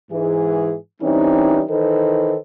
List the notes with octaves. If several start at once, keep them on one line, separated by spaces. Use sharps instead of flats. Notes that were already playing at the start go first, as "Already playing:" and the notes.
G#2 E3 G#4
E3 G3 C4 C#4 D#4
D#3 E3 D#4 A4 B4 C5